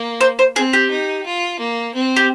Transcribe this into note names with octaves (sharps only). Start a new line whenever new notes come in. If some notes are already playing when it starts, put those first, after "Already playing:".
Already playing: A#3
C5
C5
C4 G#4
G4
D#4
F4
A#3
C4
G4